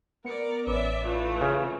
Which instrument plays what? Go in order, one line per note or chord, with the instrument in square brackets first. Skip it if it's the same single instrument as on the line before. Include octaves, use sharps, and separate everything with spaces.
[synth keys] B3 C#7 [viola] A#4 D5
[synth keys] A1 B4 D6 [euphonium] C#4 [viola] D5 E5
[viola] E3 A3 [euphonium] F4
[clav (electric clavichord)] C#3